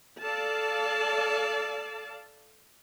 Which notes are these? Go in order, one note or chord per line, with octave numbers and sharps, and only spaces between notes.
A4 D5 F5 A5